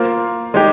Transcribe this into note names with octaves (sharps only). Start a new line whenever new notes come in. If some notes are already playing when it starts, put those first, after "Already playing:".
Already playing: A#3 F4 C5
G#3 D#4 G4